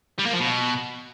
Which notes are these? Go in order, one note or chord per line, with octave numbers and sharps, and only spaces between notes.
G3
A#3
F3
B2